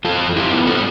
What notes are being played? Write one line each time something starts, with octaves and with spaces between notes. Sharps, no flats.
F2 F4 A4
F2
F2 E4 G4
B3
G3 F4 A4